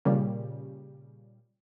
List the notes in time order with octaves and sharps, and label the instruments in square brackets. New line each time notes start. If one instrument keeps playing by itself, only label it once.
[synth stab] A#2 C#3 G3